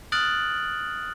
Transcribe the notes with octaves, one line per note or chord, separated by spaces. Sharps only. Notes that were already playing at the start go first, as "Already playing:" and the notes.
D#6 F6 F#6 A6 D7 F#7